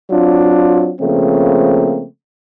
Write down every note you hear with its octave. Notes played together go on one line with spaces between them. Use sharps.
F#3 C4 D4 F4
C#3 F3 A3 A#3 C4